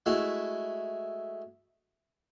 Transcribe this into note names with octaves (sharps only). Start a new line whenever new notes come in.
G#3 A3 E4 F#4